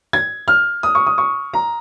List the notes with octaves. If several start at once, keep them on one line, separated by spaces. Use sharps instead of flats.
G#6
F6
D#6
C#6
D#6
C#6
A#5